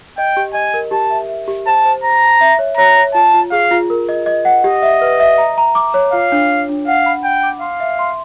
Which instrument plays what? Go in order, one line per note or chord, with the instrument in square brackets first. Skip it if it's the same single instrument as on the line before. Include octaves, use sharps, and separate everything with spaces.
[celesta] D#5 [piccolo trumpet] G5
[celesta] G4
[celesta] D#5 [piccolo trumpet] G#5
[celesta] A#4
[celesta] G4 [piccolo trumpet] A5
[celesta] E5
E5
G4
[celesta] C5 [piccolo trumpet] A5
[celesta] C5
[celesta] C5 [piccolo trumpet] A#5
[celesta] A5
E5
C#5
[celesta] C#5 [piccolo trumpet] A#5
[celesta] C#5
[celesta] F4 [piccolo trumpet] A5
[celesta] F4
[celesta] G#4 [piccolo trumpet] F5
[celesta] F4
A#4
D#5
D#5
F#5
[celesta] G4 [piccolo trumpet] D#5
[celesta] E5
B4
E5
A#5
A#5
D6
C#5
[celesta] F4 [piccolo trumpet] F5
[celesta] D4
D4
D4
[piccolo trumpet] F5 [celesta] F#5
[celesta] B5
[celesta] F#5 [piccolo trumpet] G5
[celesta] D6
[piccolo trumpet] F5 [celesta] C6
[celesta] E5
C6